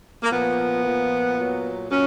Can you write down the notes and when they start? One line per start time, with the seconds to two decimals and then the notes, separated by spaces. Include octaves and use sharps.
0.23 A#3
0.30 A#2 F3 B3
0.84 A#2 F3
1.37 A#2 F#3
1.90 A#2 F#3 C#4